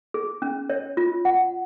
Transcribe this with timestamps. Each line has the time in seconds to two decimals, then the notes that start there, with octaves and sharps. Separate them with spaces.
0.14 G#4
0.42 C#4
0.70 C#5
0.97 F4
1.25 F#5